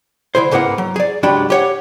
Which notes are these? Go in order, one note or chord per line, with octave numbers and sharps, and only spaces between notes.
D3 E4 G#4 C5
C#2 G#2 A#3 B3 E4 F#5
F#3
G#4 D5
C#2 G#2 F#3 D4 G4 B5
G4 C#5 F#5